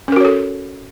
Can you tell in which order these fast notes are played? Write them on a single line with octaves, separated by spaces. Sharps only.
C#4 A#4 F#4 C#5 A4